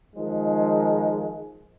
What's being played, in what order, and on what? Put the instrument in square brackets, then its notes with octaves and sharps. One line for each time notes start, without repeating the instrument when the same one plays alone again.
[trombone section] D#3 F3 G#3